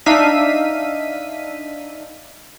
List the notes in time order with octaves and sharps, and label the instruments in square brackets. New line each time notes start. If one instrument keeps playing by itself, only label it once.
[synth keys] D4 D#4 E5 F5 B6 D#7